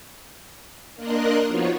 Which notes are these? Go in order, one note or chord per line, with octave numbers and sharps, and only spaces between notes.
A#3 D4 A#4 D#5 C6 F#6
F3 B3 D#4 F4 F#4 C#5